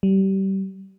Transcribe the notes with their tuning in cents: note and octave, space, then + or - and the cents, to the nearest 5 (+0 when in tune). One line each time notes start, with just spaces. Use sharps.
G3 -25